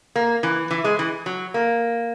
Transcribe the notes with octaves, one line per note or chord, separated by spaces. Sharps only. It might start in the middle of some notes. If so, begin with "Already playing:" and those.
A#3
E3
E3
G#3
E3
F#3
A#3